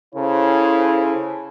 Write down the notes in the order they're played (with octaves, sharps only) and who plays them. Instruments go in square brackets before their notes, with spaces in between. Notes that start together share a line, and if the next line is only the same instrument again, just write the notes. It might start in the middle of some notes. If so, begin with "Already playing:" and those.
[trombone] C#3 [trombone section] E4 A4 C5